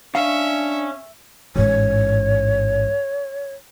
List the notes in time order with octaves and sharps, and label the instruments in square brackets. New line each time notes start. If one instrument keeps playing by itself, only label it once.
[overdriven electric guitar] C#4 [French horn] D4 [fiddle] E5 [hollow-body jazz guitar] F5
[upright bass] A1 G#2 [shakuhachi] C#5